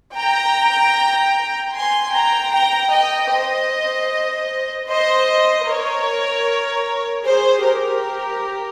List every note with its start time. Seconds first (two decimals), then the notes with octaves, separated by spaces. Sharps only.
0.16 G5 A#5
1.74 G#5 C6
2.13 G5 A#5
2.52 G5 A#5
2.92 D#5 G5
3.31 C5 D#5
4.89 C5 D#5
5.67 A#4 C#5
7.24 G#4 C5
7.64 G4 A#4